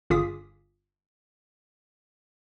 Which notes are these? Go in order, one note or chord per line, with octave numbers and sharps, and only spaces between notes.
G1 F4 G#4 D6 D#6 B6